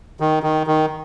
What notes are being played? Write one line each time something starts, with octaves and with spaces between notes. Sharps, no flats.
D#3
D#3
D#3